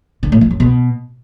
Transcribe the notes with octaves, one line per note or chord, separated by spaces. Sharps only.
D3
A2
F2
F#2
B2